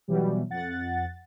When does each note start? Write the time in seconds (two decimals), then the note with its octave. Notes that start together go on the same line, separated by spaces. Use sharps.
0.08 B2 E3 F#3 G3
0.50 F2 F#5 A6